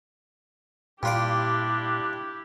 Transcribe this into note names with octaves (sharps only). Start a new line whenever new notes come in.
G2 A#2 D4 E4 F4 G4 D6